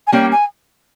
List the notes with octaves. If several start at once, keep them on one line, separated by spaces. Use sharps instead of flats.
G#5
G3 A#3 C#4 G5
G#5